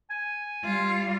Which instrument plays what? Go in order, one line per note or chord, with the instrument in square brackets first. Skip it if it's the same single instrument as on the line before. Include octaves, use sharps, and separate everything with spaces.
[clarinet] G#5
[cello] G3 F4